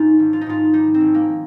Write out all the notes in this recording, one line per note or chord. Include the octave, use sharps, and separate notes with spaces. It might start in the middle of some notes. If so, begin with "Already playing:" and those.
Already playing: G#2 C#4 D#4 F4
G#1
F4
D#4
G#2 F4
G3 D#4
C4
G#1
A#3